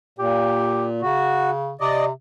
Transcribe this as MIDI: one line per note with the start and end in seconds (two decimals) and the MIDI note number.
0.19 1.02 46
0.19 0.86 67
1.02 1.75 49
1.02 1.50 66
1.81 2.11 48
1.81 2.05 74
1.81 2.05 75